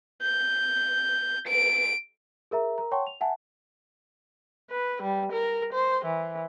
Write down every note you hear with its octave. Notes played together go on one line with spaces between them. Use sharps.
G6
D7
G#4 A#4 E5 A#5
A#4 A#5
C#5 F#5 G5 A5 C6 C#6
F7
E5 F#5 G#5 A5
B4
G3
A#4
C5
E3